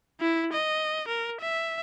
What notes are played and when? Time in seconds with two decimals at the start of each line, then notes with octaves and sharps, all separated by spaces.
0.20 E4
0.53 D#5
1.08 A#4
1.41 E5